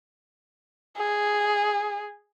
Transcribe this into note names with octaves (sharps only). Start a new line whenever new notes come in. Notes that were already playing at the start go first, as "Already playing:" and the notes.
G#4